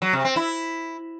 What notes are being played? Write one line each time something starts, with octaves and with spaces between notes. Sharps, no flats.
F#3
C3
C4
E4